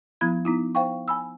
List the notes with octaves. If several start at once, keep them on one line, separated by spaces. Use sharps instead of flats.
F3 B3 E4 B5 G#6
B3 D#4 E4
C5 F5 G5 C#6
G#5 B5 E6